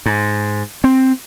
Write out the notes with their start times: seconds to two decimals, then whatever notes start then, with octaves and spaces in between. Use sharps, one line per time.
0.06 G#2
0.84 C4